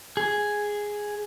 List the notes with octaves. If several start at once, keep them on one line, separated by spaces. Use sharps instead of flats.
G#4